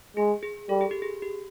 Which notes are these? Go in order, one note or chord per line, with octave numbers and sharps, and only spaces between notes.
G#3 G#4
G#4
G3 A4
G#4
G4
G#4
G4